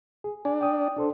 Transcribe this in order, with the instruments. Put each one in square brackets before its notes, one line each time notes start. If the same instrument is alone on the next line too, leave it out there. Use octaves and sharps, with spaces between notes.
[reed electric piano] G#4
[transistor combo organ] D4 [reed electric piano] G#5
[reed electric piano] G5 D#6
D4 A4 C5